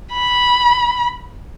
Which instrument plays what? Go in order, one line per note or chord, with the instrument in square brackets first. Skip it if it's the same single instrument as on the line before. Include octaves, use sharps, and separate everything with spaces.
[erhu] B5